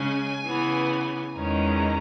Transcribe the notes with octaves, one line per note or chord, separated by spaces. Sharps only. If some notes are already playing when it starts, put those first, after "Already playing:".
Already playing: C#3 G#3 C#4 G#5
C#3 E3 B3
E2 D#3 G#3 C#4 A#5